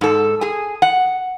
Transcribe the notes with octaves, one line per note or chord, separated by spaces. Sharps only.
G#2 A4
G#4 G#5
F#5